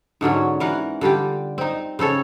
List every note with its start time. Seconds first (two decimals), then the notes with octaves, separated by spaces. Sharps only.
0.21 G#2 D3 F#3 C#4
0.60 E3 A#4 F#5
1.01 D3 G3 F4 G4
1.58 C4 D#4
1.99 C#3 C4 A4 C#5